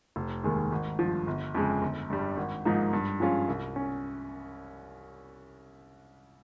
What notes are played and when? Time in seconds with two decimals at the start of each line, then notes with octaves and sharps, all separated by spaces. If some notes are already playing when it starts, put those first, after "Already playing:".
0.16 F1
0.43 D#2 D#3 G#3
0.72 G#1
0.99 G2 F3
1.27 G1
1.55 F2 C#3 G#3
1.82 G1
2.10 G2 G3
2.37 G#1
2.65 G#2 F3 A#3 D#4
2.93 G2
3.20 F3 G#3 C#4 F4
3.48 C2
3.76 C#4